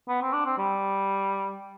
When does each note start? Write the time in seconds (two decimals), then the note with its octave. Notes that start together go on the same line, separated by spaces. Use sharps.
0.09 B3
0.22 C4
0.33 D4
0.45 C4
0.58 G3